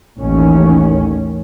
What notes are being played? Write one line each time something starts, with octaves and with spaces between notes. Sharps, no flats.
A1 D#2 D#3 C#4